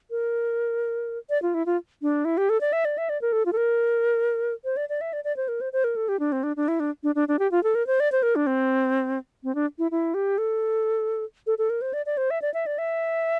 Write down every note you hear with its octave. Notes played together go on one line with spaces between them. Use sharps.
A#4
D5
F4
E4
F4
D4
E4
G4
A4
D5
E5
D5
E5
D5
A#4
A4
F4
A4
A#4
C5
D5
D5
E5
D5
D5
C5
A#4
C5
C5
A#4
A4
G4
D4
C4
D4
D4
E4
D4
D4
D4
D4
G4
F4
A4
A#4
C5
D5
C5
A#4
D4
C4
C4
D4
E4
E4
G4
A4
A4
A4
A#4
C5
D5
D5
C5
E5
D5
E5
D5
E5